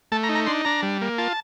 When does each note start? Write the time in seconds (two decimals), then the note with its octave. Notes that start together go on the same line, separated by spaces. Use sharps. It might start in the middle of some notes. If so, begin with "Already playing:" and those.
0.12 A3 A5
0.23 A#5
0.29 D#4
0.35 A#5
0.47 D4 C6
0.65 D4 A#5
0.83 G3
1.02 A#3
1.18 F4 A5